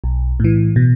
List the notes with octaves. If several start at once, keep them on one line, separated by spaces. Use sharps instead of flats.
B1
A2 E3
B2